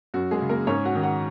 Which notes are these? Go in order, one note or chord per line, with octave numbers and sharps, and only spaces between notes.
F#2 F#4
G#3 G#4
C#3
A#3 A#4
G#2 C#4 C#5
F#4 F#5
D#3
F#4 F#5